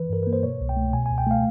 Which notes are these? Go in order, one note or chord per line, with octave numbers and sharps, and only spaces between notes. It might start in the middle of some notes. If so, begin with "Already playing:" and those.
Already playing: E3 B4
G2 A#4
A#3 B4
C5
B2 C#5
C2
G5
A3
B2 G#5
G#5
C#2
G5
A3 F5